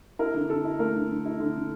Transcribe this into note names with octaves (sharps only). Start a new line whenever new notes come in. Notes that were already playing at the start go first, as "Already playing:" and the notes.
E4 A#4
D3
D3 A4
E4
A3 A#4
D3
D3
E4
D3
D3